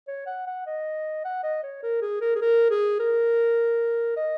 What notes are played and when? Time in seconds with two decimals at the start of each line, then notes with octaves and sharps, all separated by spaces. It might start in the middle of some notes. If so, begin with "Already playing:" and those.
0.08 C#5
0.27 F#5
0.46 F#5
0.67 D#5
1.25 F#5
1.43 D#5
1.63 C#5
1.83 A#4
2.02 G#4
2.21 A#4
2.36 G#4
2.42 A#4
2.70 G#4
3.00 A#4
4.17 D#5